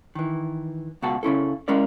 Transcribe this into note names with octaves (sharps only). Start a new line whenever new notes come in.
D#3 E3
C#2 B2 F#4 A5
C#3 C#4 E4 A4
G#3 C#4 E4 A#4 D5